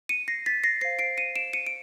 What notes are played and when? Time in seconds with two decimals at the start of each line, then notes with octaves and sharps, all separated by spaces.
0.09 C#7 D#7
0.28 A#6 C7
0.46 A6 B6
0.63 A#6 C7
0.81 C5 F5 A#6 C7
0.99 C7 D7
1.17 C#7 D#7
1.36 D7 E7
1.53 C#7 D#7
1.67 D7